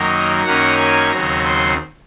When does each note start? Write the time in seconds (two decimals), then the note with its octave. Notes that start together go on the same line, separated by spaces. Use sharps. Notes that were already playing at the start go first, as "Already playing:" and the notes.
Already playing: F#2 D#3 F#3 A#3 D#5
0.45 F#2 D#3 A#3 C#4 F#5
0.78 G#5
1.11 D#2 C#3 F#3 C4 A#5
1.44 C6